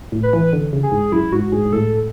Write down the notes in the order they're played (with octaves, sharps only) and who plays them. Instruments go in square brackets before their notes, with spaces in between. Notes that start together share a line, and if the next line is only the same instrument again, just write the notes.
[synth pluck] A2
[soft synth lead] B4
[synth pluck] E3
D3
C#3
[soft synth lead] G#4
[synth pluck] G#2
[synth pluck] F#2 [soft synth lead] E4
[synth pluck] G#2 [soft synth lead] F#4
[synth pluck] G#2 [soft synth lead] G#4
[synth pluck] G#2
[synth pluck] A2 [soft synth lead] A4